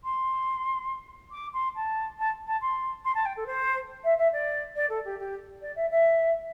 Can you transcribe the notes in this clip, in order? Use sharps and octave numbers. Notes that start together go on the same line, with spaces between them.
C6
D6
C6
A5
A5
A5
C6
C6
A5
G5
A4
C5
E5
E5
D5
D5
A4
G4
G4
D5
E5
E5